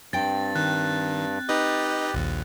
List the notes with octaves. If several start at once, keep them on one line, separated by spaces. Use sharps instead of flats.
G2 C4 G5 A6
D#3 F#6
D#4 G4 B4 D#5
A#1 D#2